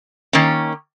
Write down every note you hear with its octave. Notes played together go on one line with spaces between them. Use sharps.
D#3 A#3 C#4